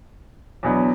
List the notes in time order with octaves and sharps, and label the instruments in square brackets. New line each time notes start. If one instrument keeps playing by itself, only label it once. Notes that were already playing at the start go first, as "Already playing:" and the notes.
[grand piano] E2 B2 F#3 B3 D4